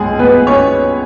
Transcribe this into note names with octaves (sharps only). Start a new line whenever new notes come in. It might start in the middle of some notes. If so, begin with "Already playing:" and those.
Already playing: C#2 B2 G#3 G#4
B3 B4
C#4 C#5